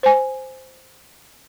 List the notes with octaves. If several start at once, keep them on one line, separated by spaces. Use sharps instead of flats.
C5 G#5